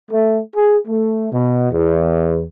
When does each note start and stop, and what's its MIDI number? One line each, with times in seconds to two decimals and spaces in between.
0.10 0.39 57
0.55 0.76 68
0.88 1.27 57
1.32 1.68 47
1.72 2.43 40